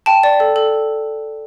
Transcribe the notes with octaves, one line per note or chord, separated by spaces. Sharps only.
G5 A5
D5
A4
A4